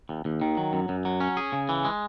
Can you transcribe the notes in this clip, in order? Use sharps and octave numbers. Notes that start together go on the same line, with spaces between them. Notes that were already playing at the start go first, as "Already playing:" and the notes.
D#2
D#2
D#3
F#3
F#2
F#2
F#3
C#4
G#4
C#3
E3
G#3